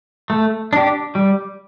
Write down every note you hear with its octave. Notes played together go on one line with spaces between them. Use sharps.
A3
D4 G4
G3